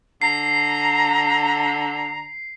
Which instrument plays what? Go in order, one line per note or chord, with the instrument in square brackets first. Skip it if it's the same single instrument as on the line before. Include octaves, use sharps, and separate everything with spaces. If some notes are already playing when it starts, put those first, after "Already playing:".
[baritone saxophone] D3 [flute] A#5 [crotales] C7